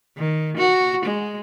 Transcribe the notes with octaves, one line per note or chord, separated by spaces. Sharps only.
D#3
F#4
G#3